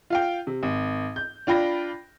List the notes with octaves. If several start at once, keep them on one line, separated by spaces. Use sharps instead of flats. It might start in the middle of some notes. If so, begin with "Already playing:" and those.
F4 F5 G5
C3
G#1
G6
D4 F4 G5 B5 A#6